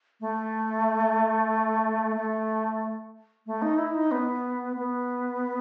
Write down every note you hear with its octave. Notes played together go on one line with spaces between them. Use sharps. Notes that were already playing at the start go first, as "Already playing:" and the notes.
A3
A3
A3
D#4
E4
D#4
B3
B3